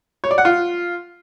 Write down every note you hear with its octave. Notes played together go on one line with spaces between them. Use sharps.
C#5
D5
F#5
F4